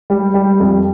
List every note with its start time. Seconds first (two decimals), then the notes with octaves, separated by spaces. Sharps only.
0.10 G3
0.34 G3
0.60 F2